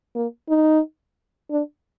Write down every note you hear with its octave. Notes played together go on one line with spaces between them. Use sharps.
A#3
D#4
D4